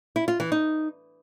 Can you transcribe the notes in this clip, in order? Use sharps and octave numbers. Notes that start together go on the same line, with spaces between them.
E4
F4
E3
D#4